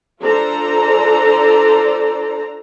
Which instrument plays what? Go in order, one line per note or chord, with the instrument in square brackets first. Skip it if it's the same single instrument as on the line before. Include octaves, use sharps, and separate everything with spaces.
[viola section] D4 F4 A4 C5 D5 A#5